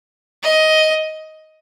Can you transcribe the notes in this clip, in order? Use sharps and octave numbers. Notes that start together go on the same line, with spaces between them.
D#5